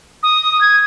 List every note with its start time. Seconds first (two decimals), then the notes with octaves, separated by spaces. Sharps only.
0.23 D#6
0.61 G#6